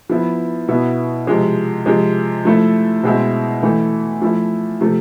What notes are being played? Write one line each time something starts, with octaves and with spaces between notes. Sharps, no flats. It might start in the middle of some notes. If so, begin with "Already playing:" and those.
F3 B3 E4
B2 B3 E4
C3 F3 G#3
C3 F3 G#3
F3 A3 E4
B2 G#3 C4 E4
E3 A3 E4
F3 A3 E4
C3 F3 A3